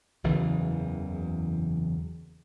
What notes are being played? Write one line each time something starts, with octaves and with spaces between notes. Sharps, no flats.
F#1 E2 C#3 E3